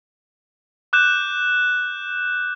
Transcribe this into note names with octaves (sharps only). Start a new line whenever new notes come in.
D6 F#6 G6 E7